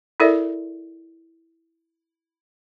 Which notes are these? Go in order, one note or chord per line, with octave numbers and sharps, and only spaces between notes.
E4 A4 A#4 D5 E5